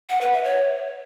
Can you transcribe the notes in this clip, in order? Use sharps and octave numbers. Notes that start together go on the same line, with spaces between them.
F#5
B4
E5
C#5